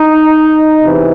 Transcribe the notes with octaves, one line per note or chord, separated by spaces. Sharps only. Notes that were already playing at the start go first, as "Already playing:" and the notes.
Already playing: D#4
E2 C3 E3